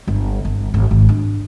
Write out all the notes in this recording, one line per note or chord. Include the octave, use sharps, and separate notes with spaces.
G1
G1
G#1
G#1
D4